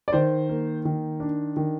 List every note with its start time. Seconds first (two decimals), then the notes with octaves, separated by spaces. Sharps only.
0.08 D5
0.13 D#3 C5
0.49 A#3
0.85 D#3
1.20 D4
1.57 D#3